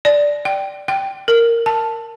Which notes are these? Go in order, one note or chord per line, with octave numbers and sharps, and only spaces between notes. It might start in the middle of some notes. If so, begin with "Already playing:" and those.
D5
G5
G5
A#4
A5